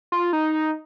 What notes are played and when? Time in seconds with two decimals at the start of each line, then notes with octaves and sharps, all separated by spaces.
0.12 F4
0.33 D#4